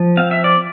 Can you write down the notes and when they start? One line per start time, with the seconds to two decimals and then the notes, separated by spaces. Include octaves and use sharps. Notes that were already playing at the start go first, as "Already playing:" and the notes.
Already playing: F3
0.17 C4 F5
0.31 E5
0.44 D5